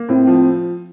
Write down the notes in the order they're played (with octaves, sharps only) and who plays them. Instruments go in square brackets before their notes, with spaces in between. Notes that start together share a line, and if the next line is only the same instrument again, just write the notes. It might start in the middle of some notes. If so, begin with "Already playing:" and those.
Already playing: [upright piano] A#3
[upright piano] A2 [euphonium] C4
[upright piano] F3